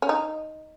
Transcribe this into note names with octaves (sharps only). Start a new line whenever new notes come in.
C#4
D#4